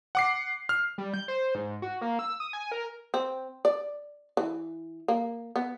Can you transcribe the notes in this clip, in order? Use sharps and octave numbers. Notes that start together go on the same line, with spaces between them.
F#5 D6 C7
F6
G3
G6
C5
G#2
F#4
A#3
E6
D#6
G#5
A#4
C4
D5
E3
A#3
B3